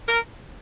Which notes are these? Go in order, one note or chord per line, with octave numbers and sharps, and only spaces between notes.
A#4